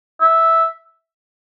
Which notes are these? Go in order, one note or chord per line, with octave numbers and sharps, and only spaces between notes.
E5